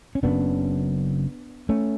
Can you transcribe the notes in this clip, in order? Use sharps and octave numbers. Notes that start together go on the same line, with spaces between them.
C#4
F#1 F#2 C#3 B3 D4
A3 C#4